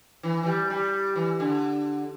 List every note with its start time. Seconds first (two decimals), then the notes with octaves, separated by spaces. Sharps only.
0.23 E3
0.43 E3
0.46 G3
0.70 G3
1.16 E3
1.40 D3